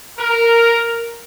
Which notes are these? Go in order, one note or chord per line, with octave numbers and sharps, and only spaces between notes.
A#4